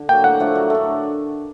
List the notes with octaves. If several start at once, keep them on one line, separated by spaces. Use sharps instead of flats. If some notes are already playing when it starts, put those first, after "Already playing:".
Already playing: D3
F#3 A#3 G5
A2 F#5
F3 A3 D4
F#3
A3 D4